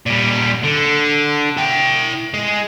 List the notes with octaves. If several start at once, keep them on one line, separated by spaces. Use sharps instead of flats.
A#2 G3
D3
E4 G5
G#3